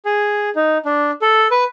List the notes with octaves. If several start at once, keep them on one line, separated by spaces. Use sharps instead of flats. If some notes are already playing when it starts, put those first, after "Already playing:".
G#4
D#4
D4
A4
B4